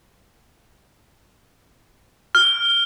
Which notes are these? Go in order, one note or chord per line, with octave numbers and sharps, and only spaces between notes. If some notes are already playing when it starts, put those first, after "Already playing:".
F6